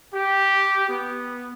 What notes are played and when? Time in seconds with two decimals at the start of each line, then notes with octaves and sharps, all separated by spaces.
0.14 G4
0.89 B3